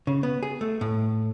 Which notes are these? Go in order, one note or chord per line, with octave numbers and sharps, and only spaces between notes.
C#3
B3
G#4
A3
A2